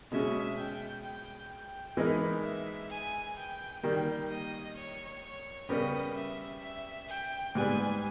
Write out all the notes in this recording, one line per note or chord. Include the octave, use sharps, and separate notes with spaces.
B2 G#3 C#4 G#4 E5
G5
G5
G5
E3 G#3 B3 D#4 A#4
E5
G#5
G5
D#3 G3 A#3 G5
D#5
C#5
C#5
C#3 G3 B3 G4 A#4 D#5
E5
E5
G5
G#2 G3 B3 G#5